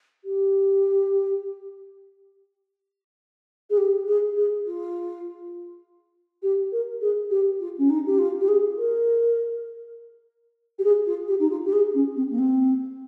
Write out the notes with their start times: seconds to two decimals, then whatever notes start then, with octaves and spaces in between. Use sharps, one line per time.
0.24 G4
3.70 G#4
3.77 G4
4.07 G#4
4.36 G#4
4.66 F4
6.42 G4
6.72 A#4
7.01 G#4
7.30 G4
7.59 F4
7.78 C#4
7.89 D#4
8.06 G4
8.18 F4
8.40 G4
8.48 G#4
8.77 A#4
10.78 G4
10.84 G#4
11.06 F4
11.27 G4
11.39 D#4
11.50 F4
11.65 G4
11.72 G#4
11.94 C#4
12.16 C4
12.30 A#3
12.38 C4